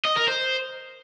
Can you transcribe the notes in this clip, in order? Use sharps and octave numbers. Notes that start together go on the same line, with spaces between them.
D#5
A#4
C5